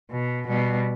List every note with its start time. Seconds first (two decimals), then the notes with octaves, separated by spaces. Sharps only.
0.11 B2
0.48 B2 G3